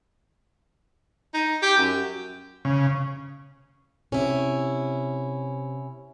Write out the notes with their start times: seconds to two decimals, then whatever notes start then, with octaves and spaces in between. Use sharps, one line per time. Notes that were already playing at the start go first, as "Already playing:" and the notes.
1.34 D#4
1.62 G4
1.77 F#2
2.65 C#3
4.12 C3 C#4 E4